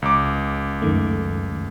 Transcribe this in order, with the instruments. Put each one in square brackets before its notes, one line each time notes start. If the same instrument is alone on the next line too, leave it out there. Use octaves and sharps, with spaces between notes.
[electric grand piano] C#2 D6
[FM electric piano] F#2 D#3 A3